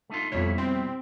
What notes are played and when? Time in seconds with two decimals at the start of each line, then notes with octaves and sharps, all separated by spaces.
0.10 A3 D#4 F4
0.32 F2 B2 G3 E4 C#5
0.58 C4